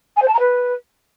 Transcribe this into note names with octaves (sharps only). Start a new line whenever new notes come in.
G#5
C5
A5
A#5
B4